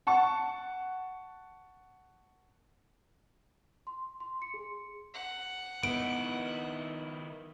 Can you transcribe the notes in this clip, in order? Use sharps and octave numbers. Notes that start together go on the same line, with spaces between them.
F#5 A5 C#6
C6
C6
C#7
G#4
F#5
D#3 B3 E4 D7